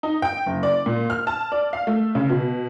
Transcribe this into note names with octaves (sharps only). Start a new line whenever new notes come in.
D#4
G5
F#1
D5
A#2
F6
A5
D5
F5
A3
C#3
B2